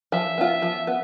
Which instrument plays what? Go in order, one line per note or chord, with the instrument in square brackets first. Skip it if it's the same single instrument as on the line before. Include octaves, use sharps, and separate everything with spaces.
[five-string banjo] F3 [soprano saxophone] E5
[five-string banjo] B3 F4
F3
B3